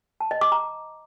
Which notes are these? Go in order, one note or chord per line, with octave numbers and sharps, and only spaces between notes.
A5
D#5
D6
A#5